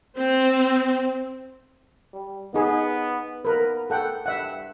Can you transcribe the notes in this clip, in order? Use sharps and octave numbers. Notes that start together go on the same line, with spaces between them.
C4
G3
B3 D#4 G#4
B3 A#4 B4
A4 F#5 G5
G2 E5 F#5